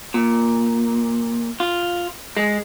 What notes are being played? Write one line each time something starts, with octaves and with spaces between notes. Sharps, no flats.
A#2
F4
G#3